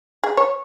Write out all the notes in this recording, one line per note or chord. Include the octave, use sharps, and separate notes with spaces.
G#4
C#5